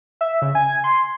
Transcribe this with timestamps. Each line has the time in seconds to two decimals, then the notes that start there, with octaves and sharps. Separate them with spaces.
0.21 E5
0.42 C#3
0.55 G#5
0.84 C6